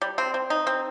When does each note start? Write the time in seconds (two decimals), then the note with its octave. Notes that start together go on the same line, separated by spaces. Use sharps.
0.02 G3
0.18 C4
0.34 C4
0.50 D#4
0.67 C4